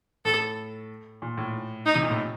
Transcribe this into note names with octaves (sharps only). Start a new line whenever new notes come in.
A2 A4
A#2
A2
D#4
C3
A#2
A2